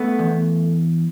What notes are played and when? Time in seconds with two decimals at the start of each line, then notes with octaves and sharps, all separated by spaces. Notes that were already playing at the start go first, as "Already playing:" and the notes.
Already playing: A3 B3
0.19 E2